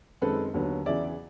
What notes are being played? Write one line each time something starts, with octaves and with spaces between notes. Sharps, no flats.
F#2 D#3 G#3 C4 A4 B4
D#2 D3 F#3 B3
E2 C#3 E3 D5 E5